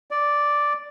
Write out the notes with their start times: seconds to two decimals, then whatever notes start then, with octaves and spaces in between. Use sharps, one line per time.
0.11 D5